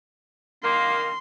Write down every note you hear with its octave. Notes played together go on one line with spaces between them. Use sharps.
D#3 A#3 C6